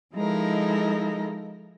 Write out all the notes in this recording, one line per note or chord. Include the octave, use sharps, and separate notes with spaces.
F3 G#3 D#4 E4 A4 A#4